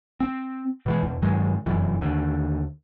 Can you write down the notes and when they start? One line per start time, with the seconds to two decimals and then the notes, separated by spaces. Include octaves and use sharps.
0.20 C4
0.86 B2 E3 G#3
1.03 E2 B2
1.22 G2 D#3 F#3 G#3
1.66 F1 F#2 E3
2.01 D#2 D3